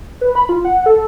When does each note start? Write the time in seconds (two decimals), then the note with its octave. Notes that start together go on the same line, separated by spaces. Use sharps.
0.21 B4
0.35 B5
0.49 F4
0.65 F#5
0.86 A4